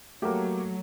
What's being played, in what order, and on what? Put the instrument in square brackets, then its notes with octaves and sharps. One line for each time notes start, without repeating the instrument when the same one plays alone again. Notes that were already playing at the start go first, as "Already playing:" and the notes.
[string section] F#3 [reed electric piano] A3 [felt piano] A#3 F#4 G4